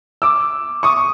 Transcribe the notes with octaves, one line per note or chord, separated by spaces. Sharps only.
D6 E6
C#6 D#6